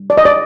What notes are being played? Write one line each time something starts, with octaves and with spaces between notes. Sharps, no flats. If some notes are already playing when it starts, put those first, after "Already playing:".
Already playing: G3
D5
D#5
D5